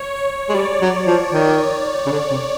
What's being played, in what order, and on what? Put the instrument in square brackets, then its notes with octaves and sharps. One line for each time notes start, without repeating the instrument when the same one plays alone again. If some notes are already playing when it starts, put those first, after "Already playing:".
Already playing: [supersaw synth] C#5
C#5
[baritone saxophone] G#3
[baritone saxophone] G3 [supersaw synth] D5
[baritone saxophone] F#3
F3
D#3
C#3
D3
C3